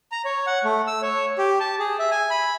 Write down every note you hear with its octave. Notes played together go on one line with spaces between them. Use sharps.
A#5
C#5
F#5
A3
E6
C#5
G4
A5
G#4
E5
G#5
B5